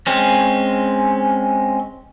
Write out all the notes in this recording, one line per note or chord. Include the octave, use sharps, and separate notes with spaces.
G#3 C4 C#4